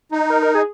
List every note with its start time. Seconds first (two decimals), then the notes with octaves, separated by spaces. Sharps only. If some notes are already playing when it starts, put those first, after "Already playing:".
0.12 D#4
0.30 A#4
0.42 A#4
0.55 G#4